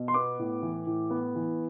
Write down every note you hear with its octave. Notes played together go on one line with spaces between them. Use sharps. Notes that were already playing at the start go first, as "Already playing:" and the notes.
Already playing: B2
C6
B3 D6
A2
E3
A2
B3
E3